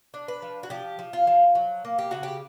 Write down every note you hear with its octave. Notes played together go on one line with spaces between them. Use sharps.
D4
B4
F3
F#4
F3 G4
F3
F4
F3
F#3
A#3
G4
C#3 F#4
G4